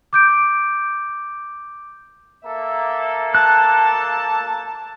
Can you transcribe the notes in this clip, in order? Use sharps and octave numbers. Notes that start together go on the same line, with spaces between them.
D6 G6 D7
A#3 A4 E5
A5 F#6